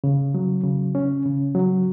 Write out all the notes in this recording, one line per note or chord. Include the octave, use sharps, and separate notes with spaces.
C#3
F#3
C#3
C#4
C#3
F#3